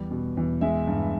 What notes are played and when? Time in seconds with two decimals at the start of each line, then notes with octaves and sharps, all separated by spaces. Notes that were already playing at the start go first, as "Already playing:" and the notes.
Already playing: E2 G3
0.11 B2
0.37 E2
0.61 G#3 E5
0.87 G2